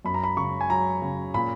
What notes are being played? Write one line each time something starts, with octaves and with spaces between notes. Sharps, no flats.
F#2 B5
A#5
B5
C#3 C#6
G#5
F#3 A#5
C#3
A#2 B5